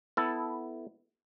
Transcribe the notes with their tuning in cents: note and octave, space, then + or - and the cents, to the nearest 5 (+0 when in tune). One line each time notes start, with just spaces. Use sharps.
B3 +15 E4 +0 A4 +0